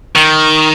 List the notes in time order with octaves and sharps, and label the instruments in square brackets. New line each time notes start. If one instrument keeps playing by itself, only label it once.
[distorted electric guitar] D#3